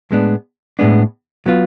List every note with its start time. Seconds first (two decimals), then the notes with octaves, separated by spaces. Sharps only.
0.11 A2 G#3 B3 D4
0.79 A2 G#3 B3 D4
1.46 F#3 B3 F4